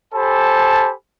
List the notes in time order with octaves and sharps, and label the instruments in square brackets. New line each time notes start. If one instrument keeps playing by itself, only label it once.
[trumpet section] G4 A4 C5 G#5 A5 B5